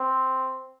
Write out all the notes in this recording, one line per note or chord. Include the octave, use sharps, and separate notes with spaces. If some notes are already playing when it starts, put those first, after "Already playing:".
Already playing: C4